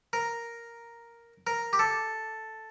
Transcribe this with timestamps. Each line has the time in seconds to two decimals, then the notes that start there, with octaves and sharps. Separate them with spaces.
0.13 A#4
1.47 A#4
1.73 G4
1.79 A4